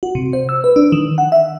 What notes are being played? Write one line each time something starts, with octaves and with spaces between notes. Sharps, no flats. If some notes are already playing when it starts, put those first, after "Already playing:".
F#4
C3
C5
E6
B4
D4
D#3
F#5
E5